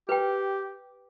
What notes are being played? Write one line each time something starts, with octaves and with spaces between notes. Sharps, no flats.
G4 B4 G5